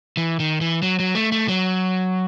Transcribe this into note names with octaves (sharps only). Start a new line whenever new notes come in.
E3
D#3
E3
F#3
F#3
A3
A3
F#3